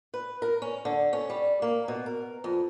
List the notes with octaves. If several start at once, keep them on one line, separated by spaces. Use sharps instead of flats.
B4
A#4
C#4
D3
C#4
G3
A#3
B2
A#4
F2